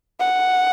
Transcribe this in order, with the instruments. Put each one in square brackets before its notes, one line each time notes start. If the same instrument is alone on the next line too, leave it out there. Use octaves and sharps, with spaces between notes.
[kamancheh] F#5